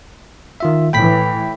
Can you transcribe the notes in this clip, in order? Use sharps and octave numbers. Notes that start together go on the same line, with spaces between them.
D#3 F4 E5
A2 E3 G5 B5 B6